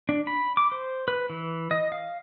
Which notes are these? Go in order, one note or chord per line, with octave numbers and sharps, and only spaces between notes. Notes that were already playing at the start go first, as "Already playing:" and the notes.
D4
B5
D6
C5
B4
E3
D#5
F5